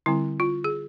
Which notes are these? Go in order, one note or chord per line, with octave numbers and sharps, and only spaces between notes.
D3 G3 C4 E4
F4
G#4